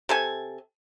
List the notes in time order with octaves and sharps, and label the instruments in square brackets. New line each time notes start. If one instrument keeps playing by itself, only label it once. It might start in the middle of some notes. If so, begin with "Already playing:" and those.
[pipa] C3 A4 G#5